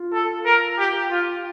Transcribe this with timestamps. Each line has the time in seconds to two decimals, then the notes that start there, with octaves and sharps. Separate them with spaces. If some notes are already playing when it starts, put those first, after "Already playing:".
Already playing: F4
0.13 A4
0.46 A#4
0.78 G4
1.11 F4